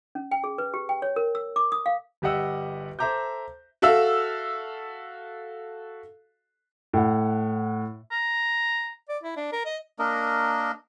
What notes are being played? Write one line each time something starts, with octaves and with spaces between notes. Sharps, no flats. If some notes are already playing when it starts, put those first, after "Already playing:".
C#4
G5
G#4
B4
G4
G5
C#5
A#4
E6
D6
D#6
F5
G1 G3 G4 D#5 F#5 E6
A4 C5 E5 A#5 D6 G6
F#4 A4 E5 F5 E6
A2 F#5
A#5
D5
E4
D4
A#4
D#5
A#3 D4 A#4 D#5